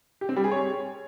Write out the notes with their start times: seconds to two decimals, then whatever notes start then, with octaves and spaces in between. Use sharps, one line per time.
0.21 G4
0.29 C4
0.36 G3
0.44 G#4
0.51 C#5